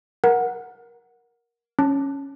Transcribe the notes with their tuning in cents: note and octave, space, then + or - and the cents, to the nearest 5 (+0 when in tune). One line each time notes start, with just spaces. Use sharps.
A#4 +10 F#5 -10
C#4 +0 A5 +0